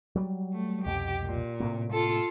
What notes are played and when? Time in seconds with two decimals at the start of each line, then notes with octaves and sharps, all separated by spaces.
0.16 F#3 G3
0.54 A3
0.85 C2 F2 B2 G4
1.25 A#2
1.60 A2 C3 A#3
1.93 F4 A4